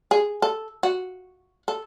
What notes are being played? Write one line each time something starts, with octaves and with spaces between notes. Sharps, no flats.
G#4
A4
F#4
A4